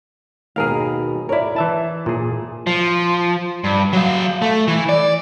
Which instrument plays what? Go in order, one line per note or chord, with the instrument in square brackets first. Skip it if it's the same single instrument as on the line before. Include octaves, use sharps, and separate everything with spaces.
[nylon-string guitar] D#2 B2 [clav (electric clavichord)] G#4 A#4 F5
[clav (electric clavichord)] E4 A#4 [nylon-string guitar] C#5 D5
[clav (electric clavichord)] E3 E5 A5
A#2 G#4
[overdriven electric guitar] F3
G2
F#3 F5
A3
E3
D5